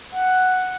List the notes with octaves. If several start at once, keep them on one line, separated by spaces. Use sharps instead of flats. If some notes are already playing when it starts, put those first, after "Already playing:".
F#5